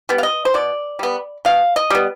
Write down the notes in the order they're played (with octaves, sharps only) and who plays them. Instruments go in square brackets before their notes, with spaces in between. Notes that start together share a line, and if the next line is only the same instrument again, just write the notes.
[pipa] G3 B3
F5
D#5
C5
B2 D5
G3 B3
B2 F5
D#5
G3 B3